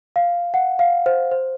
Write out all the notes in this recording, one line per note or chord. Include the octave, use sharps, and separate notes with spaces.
F5
F#5
F5
C5
C5